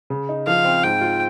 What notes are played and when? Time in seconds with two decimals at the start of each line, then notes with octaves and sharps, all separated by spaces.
0.10 C#3
0.29 D#4
0.47 F3 F5
0.65 C4
0.83 G#2 G5
1.01 F4